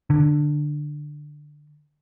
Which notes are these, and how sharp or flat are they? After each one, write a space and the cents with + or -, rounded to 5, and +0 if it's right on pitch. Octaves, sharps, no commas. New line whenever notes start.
D3 +10